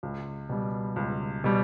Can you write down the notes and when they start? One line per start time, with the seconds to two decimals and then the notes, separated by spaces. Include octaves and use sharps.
0.03 C#2
0.49 B2 G3
0.96 C#2
1.44 B2 G3